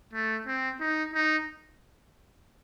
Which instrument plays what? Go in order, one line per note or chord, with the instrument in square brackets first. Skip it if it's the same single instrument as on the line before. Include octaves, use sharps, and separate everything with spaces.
[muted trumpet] A3
C4
D#4
D#4